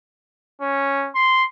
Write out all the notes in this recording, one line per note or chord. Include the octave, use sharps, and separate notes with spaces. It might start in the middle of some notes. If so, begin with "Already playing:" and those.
C#4
C6